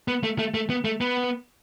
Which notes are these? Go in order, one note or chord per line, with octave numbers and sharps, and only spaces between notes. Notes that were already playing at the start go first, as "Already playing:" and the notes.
B3
A3
A3
A3
B3
A3
B3